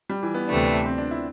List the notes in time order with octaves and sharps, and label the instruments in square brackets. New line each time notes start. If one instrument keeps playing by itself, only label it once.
[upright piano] G3
E3
B3
[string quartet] D2 C3 E3 A3 D4
[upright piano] C4
D4
E4